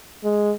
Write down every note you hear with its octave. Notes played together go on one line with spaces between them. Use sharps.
G#3